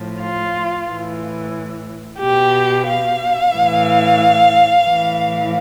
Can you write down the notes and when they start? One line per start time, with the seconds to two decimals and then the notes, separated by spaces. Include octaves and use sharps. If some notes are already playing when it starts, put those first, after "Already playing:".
Already playing: A2 F3
0.20 F4
0.87 A2 E3
2.20 B2 G4
2.87 F5
3.54 A2 E3
4.87 A2 E3